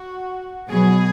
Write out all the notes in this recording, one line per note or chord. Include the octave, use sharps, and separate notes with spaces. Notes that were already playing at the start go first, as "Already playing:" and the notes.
Already playing: F#4
B2 F#3 B3 G#4